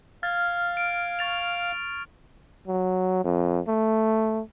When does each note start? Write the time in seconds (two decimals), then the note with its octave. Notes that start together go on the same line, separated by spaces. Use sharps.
0.23 F5 F6 G#6 A6
0.77 D7
1.19 C#6 A6 F7
2.67 F#3
3.24 F2
3.68 A3